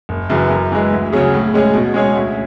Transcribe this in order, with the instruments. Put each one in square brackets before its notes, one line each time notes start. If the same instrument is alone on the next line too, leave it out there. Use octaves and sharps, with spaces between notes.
[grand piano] F#1
F#2 C#3 E3
F#2
E3 G#3
D2
C#3 F#3 C#4 G#4
A2
G#3 C#4 G#4
B2
G#3 C#4 G#4 C#5
D2